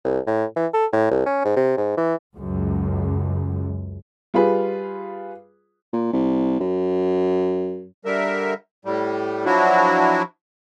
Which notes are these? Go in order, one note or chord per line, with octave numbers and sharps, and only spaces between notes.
C2
A2
E3
A4
A2
C2
C#4
G#2
C3
G#2
E3
C#2 F#2
G3 F4 G#4 B4
A#2
C2
F#2
D3 G3 A#4 E5
A2 G3
F3 F#3 D4 E4 F#4